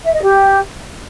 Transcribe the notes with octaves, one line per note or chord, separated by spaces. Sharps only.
E5
D#5
G4